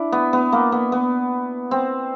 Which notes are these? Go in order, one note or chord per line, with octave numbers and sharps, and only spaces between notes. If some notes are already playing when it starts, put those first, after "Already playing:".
Already playing: D4 E4
B3
B3
A#3
B3
B3
C4